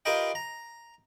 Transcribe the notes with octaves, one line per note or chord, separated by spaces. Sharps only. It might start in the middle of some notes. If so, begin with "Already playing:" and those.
F4 G4 A#4 B4 D#5 G5
A#5